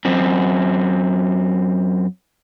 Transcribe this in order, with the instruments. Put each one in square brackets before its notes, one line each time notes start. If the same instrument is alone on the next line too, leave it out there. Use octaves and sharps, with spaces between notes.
[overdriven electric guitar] F#2 C4